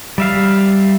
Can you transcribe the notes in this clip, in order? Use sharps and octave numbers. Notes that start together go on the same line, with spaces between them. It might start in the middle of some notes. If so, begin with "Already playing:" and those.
G3 E5 F5